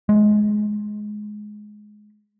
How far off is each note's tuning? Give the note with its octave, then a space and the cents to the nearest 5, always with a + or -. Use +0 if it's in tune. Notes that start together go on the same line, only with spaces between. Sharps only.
G#3 +15